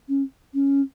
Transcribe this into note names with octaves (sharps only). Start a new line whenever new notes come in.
C#4
C#4